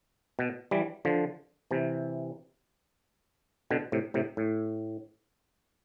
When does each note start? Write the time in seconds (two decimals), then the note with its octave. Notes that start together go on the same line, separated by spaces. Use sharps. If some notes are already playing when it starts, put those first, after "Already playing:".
0.39 B2
0.71 E3 G3
1.05 D3 F3
1.71 C3 E3
3.71 B2 D3
3.92 A2 C3
4.14 A2 C3
4.37 A2